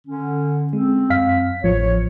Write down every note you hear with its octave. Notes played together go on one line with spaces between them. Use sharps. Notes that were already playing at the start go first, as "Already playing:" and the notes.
D3 C#4
G#3 C4
F#2 F5 B6
A1 F3 C#5